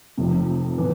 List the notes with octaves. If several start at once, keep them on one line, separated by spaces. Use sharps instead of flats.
F1 F2 C3
A2 E3 B3